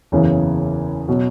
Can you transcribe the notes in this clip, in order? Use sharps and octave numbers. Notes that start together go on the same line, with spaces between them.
F#1 E2 C#3 E3
B2 F#3